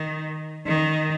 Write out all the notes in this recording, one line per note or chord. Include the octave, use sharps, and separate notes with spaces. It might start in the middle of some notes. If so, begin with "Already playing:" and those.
Already playing: D#3
D#3